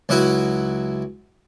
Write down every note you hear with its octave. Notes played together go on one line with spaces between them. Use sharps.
C#2 F#3 E4 F#4